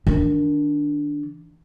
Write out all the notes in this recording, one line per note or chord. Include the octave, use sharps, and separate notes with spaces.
D#3 D4